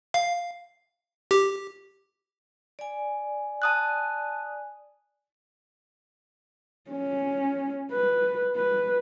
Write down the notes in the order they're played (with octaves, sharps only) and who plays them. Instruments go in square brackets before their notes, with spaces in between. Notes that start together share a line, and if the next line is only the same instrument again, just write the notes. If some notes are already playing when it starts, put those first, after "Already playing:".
[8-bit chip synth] F5
G4
[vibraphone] D5 G#5
[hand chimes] A5 D#6 F#6
[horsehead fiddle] C#4
B4
B4